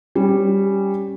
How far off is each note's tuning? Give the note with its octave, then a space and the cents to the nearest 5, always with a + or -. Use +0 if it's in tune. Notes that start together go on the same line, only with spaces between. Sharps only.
G3 +0 C#4 -10